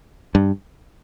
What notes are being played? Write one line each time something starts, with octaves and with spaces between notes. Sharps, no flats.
G2